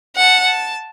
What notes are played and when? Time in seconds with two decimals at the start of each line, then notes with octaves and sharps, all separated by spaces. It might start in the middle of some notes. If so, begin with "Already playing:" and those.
0.16 F#5 A5
0.46 A5